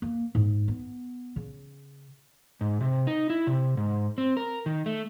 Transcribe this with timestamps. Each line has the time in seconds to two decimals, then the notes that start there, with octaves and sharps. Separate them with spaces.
0.02 A#3
0.35 G#2
0.68 B3
1.36 C#3
2.61 G#2
2.81 C3
3.07 D#4
3.30 E4
3.47 C3
3.77 G#2
4.18 C4
4.37 A#4
4.66 D#3
4.86 A3